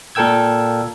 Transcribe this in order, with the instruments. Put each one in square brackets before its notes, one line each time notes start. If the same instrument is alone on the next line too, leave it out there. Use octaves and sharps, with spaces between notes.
[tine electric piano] A#2 A4 A#4 G5 E6 G#6